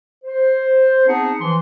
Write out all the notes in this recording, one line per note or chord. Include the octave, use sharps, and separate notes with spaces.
C5
B3 C4 D#4 G#4 F#5 A5
E3 F3 C6